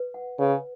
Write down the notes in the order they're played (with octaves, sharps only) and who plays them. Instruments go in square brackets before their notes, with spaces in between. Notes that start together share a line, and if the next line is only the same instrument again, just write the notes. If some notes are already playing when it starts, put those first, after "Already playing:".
Already playing: [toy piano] B4
F#5
[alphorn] C#3 [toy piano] B4